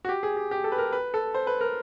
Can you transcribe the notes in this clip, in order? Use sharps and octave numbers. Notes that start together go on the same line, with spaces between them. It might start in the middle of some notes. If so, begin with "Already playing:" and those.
F#4
G4
G#4
G4
G4
A4
B4
A#4
B4
A4
C5
B4
A#4